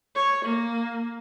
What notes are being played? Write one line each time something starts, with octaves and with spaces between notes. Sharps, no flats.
C#5
A#3